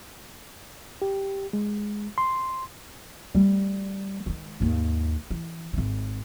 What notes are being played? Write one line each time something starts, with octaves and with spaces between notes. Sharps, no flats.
G4
G#3
C6
G3 A3
D#3 G#3
D#2 G#2
E3
G#1 D#3